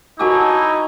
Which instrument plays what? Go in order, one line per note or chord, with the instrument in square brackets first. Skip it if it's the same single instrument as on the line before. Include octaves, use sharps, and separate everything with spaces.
[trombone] D#4 [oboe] E4 [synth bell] F#4 F#5 D6 [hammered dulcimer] C#5 G#5 A5